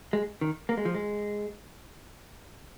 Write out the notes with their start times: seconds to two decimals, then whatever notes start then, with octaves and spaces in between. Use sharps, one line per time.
0.13 G#3
0.41 D#3
0.69 A#3
0.77 G#3
0.85 F3
0.95 G#3